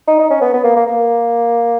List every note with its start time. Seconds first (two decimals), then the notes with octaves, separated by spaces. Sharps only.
0.07 D#4
0.19 D#4
0.30 C#4
0.41 B3
0.53 B3
0.64 A#3
0.76 A#3
0.87 A#3